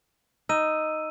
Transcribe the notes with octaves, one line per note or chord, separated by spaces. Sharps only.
D#4 E6 D#7